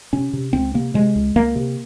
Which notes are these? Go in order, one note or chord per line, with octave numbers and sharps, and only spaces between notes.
C3 C#4
C3
C#2 C4
C3 A#3
C3 G#3
C#2
C#2 A#3
C3